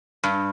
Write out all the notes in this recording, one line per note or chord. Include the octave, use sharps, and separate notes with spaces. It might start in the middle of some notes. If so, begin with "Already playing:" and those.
G2